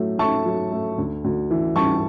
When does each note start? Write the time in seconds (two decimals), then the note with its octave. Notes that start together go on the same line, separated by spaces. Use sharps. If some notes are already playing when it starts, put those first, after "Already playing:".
Already playing: A2 F#3 A3
0.19 A3 A5 C#6
0.45 F#3
0.72 A3
0.98 D2
1.24 D2
1.51 E3
1.76 G3 A5 C#6